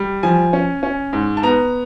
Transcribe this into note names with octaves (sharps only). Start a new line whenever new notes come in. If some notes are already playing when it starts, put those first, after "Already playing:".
Already playing: G3
F3 G#5
C#4
C#4
G#2
A5
B3 A#5